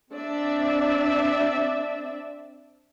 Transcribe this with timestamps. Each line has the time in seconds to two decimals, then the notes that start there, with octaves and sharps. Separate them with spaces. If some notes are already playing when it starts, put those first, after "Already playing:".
0.14 C4 D4 D5 E5